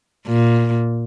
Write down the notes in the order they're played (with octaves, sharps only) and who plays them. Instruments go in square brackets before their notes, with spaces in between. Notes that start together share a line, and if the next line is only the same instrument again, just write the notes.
[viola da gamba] A#2